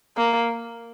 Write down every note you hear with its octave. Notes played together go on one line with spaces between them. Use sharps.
A#3